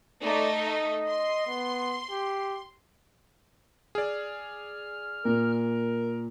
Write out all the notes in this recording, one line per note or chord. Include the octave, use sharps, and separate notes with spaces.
A3 D#4 D5
D#5
C6
B3
G4
G#4 D5 F6
A#2 A#4